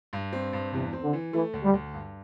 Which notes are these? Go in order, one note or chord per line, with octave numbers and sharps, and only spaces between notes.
G2
C4
G2
E2 C3
C4
D3
E3
E3 A3
D2
G3
D2
G2